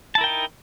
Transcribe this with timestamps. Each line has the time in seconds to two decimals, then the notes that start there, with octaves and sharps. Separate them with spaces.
0.15 A5
0.18 E4
0.21 A#4
0.24 G5
0.27 D#4